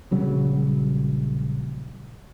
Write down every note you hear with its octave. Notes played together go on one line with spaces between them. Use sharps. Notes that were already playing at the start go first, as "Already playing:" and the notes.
A#1 C#3 F#3 G3